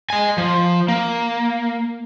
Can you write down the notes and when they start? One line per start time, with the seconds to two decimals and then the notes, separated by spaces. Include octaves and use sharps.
0.10 D#5 G#5
0.38 F3
0.88 A#3